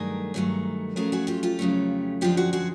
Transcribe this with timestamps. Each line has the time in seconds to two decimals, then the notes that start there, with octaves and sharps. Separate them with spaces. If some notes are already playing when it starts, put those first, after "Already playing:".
Already playing: G2 D#3 F#3 A3 G#4 A#4
0.34 G2 D#3 F#3 A3
0.96 F2 C#3 F#3 A3 G#4 A#4
1.12 F#4 G#4
1.27 F4 G4
1.43 F4 G4
1.59 F2 C#3 F#3 A3
2.21 F#2 D3 F3 G#3 F4 G4
2.37 F#4 G#4
2.53 F#4 G#4